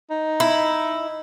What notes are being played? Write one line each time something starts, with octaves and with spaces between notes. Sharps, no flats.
D#4
E4